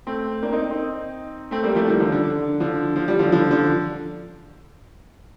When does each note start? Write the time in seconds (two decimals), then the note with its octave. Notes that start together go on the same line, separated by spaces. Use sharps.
0.07 A3 C4
0.43 A#3 D4
0.53 C4 D#4
0.70 C4 D#4
1.51 A3 C4
1.63 G3 A#3
1.75 F3 A3
1.88 D#3 G3
2.00 D3 F3
2.12 D3
2.23 D3
2.60 D3 F3
2.96 F3
3.08 G3
3.19 D3 F3
3.32 D3 F3
3.51 D3 F3